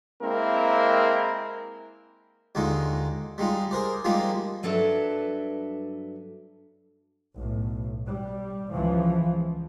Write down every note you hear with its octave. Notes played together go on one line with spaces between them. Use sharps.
G#3 A#3 C4 E4 A#4
D#2 D3 G#3 D#4 F4
G3 G#3 D#4 F4
G#4 A#4 C5 D5
F3 G3 G#3 A#3 D#4 F4
G2 F#3 D4 A4 B4 E5
B1 A2
G3
C#2 E3 F3